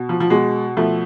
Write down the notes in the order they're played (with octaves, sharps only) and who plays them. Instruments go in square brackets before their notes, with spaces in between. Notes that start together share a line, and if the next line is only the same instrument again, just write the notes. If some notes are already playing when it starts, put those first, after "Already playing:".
Already playing: [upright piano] B2
F3
F3
B2 G#3
B2 F3 A3